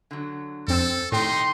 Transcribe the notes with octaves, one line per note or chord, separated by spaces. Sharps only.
D3 F#3
F2 C4 A4 E6
A2 D#3 D#4 G4 G5 C6